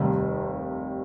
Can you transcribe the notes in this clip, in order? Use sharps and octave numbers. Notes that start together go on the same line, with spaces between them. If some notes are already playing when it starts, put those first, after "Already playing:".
Already playing: F1 D#2 D#3 G3